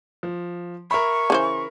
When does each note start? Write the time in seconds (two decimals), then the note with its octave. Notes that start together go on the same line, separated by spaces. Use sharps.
0.23 F3
0.91 A#4 E5 B5 C#6
1.30 C#3 E3 C5